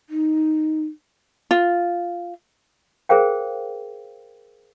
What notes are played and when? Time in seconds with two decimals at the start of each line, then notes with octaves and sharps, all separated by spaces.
0.10 D#4
1.51 F4
3.09 G#4 A#4 C5 F5 G5